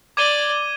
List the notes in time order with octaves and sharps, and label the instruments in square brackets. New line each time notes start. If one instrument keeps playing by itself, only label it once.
[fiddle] D5 [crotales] D6 G#6 D#7 G7